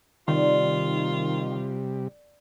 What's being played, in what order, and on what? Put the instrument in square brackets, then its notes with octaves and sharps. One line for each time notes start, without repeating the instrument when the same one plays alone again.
[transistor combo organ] C3 G3 [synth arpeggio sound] D#3 [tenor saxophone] F4 [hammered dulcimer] D5 C6